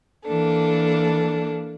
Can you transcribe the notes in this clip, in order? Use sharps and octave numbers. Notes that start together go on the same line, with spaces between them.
E3 A#3 D4 A4